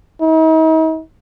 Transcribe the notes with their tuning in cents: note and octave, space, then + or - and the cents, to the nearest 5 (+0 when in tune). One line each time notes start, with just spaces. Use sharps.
D#4 +45